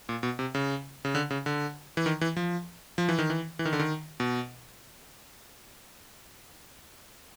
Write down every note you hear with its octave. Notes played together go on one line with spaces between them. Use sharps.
A#2
B2
C3
C#3
C#3
D3
C#3
D3
E3
D#3
E3
F3
F3
E3
D#3
E3
E3
D#3
D3
D#3
B2